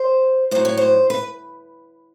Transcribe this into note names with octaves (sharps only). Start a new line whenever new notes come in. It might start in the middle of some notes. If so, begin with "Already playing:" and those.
Already playing: C5
A2 F#3 C5
C#5
C5
B4